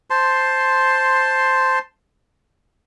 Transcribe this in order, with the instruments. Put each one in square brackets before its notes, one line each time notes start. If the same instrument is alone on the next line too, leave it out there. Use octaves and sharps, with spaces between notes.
[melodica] C5 A5 C6